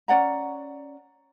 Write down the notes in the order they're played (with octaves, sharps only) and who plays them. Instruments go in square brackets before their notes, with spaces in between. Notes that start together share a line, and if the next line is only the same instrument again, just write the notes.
[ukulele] C#4 D5 F#5 A#5